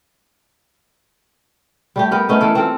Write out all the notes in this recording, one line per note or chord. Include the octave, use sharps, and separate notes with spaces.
G3 A3 G4
B3 G4 A#4
A3 B3 C#4 D#4
E3 A#3 A4
C4 F4 A4